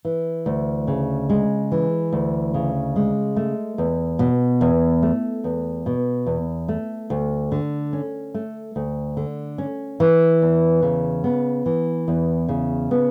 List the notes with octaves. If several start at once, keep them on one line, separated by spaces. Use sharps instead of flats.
E3
D2
C#3
G#3
E3
D2
C#3
G#3
A3
E2
B2
E2
A3
E2
B2
E2
A3
D2
D3
C#4
A3
D2
D3
C#4
E3
E2
C#3
B3
E3
E2
C#3
B3